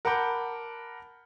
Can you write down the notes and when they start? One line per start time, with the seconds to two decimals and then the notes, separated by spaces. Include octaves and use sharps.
0.05 A#4 F#5 A5 B5 D6 G6